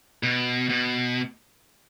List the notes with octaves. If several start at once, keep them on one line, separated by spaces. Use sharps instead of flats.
B2
B2